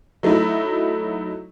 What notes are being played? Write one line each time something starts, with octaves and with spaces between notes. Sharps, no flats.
F#3 A3 D#4 E4